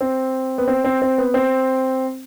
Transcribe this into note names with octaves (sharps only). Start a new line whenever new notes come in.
C4
B3
C4
C4
C4
B3
C4